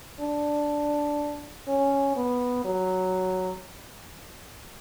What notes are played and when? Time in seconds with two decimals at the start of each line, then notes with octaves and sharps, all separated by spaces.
0.21 D4
1.68 C#4
2.16 B3
2.65 F#3